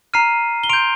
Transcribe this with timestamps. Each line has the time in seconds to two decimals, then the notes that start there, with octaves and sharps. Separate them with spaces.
0.14 A#5 F6 C7 D#7
0.64 G7
0.69 C6 G6 D7 F7